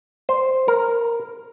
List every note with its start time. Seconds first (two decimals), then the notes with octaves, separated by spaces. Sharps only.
0.29 C5
0.68 A#4